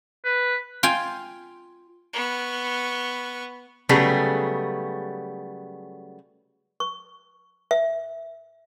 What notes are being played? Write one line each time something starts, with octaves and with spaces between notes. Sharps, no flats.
B4
F4 G5 G#5
B3 C#6
C#3 F#3 G3 A3 B3 G#4
C#6
E5